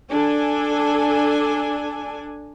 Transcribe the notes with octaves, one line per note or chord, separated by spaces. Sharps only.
D4 A4 G#5